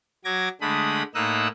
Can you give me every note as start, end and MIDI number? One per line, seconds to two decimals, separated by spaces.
0.25 0.48 54
0.25 0.48 86
0.25 0.48 92
0.25 0.48 94
0.61 1.03 50
0.61 1.03 56
0.61 1.03 57
0.61 1.03 83
0.61 1.03 87
1.15 1.48 45
1.15 1.48 58
1.15 1.48 63
1.15 1.48 87
1.15 1.48 88
1.15 1.48 90